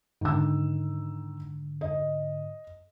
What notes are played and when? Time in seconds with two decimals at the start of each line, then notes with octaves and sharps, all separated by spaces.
0.21 G#2 D3 D#3 E6
1.81 D#5